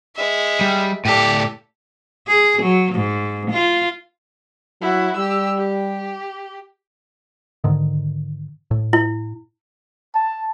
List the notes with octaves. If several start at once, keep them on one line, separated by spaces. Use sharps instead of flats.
G#3 E5
G3
A2 G4 A4 D5
G#4
F#3
G#2
F4
F#3 E4 F#4
G3 G4 E6
G4
G#2 D3 D#3
A2
E4
A5